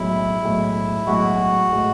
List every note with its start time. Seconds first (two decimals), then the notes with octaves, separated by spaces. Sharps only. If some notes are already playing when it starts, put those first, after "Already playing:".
Already playing: B1 A2 G#3 E4
0.42 B1 A2 G#3
1.07 B1 A2 G#3 F#4
1.71 A2 G#3